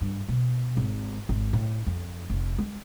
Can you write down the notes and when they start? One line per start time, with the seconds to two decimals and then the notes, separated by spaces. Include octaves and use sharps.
0.01 G2
0.29 B2
0.77 G#1
1.29 G#1
1.53 A2
1.87 F2
2.30 F1
2.58 G#3